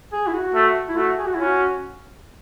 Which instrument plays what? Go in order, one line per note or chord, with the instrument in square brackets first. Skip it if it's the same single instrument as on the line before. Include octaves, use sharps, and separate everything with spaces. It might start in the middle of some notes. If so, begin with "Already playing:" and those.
[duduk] G#4
E4
F#4
[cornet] A3
[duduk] E4
[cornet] A3 [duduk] F#4
[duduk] G#4
F#4
E4
[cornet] C#4 [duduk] F#4